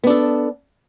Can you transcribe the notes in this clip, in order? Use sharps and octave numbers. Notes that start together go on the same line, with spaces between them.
B3 D4 A4